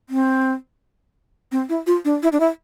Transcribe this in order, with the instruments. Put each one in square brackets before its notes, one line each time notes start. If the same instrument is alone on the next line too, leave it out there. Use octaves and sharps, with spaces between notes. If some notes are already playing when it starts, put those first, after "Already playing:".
[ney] C4
C4
E4
F4
D4
E4
D4
E4